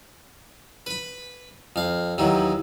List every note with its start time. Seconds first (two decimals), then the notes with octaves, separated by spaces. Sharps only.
0.86 B4 B5
1.76 F2 F5
2.18 D#2 D#3 E3 F#3